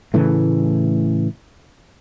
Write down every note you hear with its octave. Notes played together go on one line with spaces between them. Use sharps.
A2 C#3 E3 A3